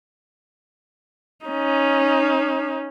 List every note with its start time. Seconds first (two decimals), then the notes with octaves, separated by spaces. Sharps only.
1.46 C#4 D#4